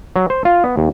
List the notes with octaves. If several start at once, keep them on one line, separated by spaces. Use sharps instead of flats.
F#3
C5
F4
B3
D#2